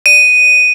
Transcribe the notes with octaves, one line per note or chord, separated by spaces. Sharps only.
D#7